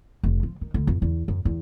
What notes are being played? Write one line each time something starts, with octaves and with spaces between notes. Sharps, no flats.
F1
F3
D#3
D2
F2
E2
F#2
E2